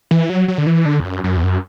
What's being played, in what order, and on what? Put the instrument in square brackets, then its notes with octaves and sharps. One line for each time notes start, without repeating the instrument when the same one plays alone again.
[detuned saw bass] E3
F#3
F#3
D3
E3
D3
E2
F#2
F#2
E2
F#2